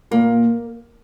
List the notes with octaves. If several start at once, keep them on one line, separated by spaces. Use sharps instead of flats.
A#2 A#3